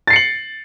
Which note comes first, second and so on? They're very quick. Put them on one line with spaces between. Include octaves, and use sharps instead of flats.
A6 C7 C#7 F#7